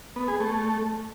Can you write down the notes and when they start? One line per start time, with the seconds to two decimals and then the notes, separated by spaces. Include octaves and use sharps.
0.16 B3
0.28 G#4
0.40 A3